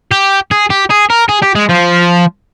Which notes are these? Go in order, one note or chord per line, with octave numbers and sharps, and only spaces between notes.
G4
G#4
G4
G#4
A#4
G#4
G4
G#3
F3